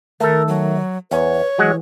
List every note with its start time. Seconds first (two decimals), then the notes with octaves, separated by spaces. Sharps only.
0.20 D#3 A3 A4 A#4
0.48 F#3
1.11 E2 B4 C#5
1.58 E3 F#3 G#3 F#5